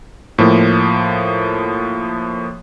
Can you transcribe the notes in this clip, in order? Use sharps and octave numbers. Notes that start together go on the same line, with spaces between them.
A2 F3 A#3